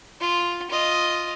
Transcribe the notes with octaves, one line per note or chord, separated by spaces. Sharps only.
F4
F4 D#5